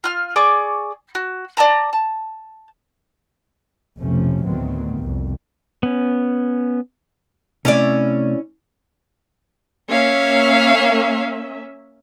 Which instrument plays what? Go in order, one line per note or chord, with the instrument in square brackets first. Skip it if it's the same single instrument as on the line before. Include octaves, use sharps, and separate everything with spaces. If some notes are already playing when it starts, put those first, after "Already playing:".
[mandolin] F4 F6
G#4 D5 C#6 D6
F#4
D5 D#5 A5 A#5
A5
[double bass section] F1 B1 C3 F3 A3 C#4
D2 A2 D#3 F#3 B3 C4
C2 F2
[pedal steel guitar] B3 C#4
[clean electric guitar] C3 A3 [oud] C#4 E4 D5
[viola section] A#3 C#4 E5 [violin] C#5 F5